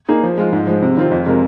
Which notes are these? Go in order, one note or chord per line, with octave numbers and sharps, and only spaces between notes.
A#3 D#4 G#4
F3
G#3 F4
G#2
F3 G#3
C3
D#3 C4 F4
F2
C3 G#3 F4 A#4